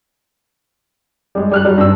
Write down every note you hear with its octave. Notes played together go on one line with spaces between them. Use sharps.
G3 G#3
G3 F6 F#6
F#3 G3
G2 E6